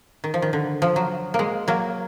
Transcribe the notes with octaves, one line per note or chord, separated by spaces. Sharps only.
D#3
F3
D#3
D3
F3
F#3
A#3
G#3
F#3 A#3